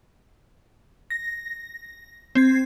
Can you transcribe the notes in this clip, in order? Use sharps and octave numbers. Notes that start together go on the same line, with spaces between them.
A#6
C4 G#6